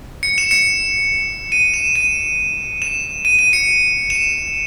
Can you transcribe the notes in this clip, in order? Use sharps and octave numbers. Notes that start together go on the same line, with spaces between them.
C#7
E7
C#7
D#7
E7
D#7
E7
D#7
D#7
C#7
E7